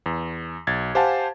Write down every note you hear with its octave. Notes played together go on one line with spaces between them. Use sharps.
E2
B1 G#6 A6
G4 C5 F5 F#5 G#5 A5